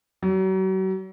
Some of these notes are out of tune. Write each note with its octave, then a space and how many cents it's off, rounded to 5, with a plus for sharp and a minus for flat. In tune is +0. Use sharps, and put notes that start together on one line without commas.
F#3 +40